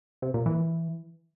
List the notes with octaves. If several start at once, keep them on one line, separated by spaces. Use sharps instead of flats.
C3
A#2
E3